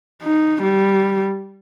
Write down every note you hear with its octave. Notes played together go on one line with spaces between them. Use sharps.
D#4
G3